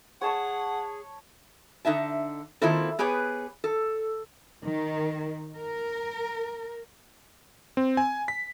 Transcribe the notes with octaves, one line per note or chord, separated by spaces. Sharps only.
G#4 C#5 F#5 A5 C#6
D3 D#4 E5 A5
D#3 A#3 C4 E4 F4 A4
B3 G4 G#4 B4 C#5
A4
D#3
A#4
C4
G#5
B6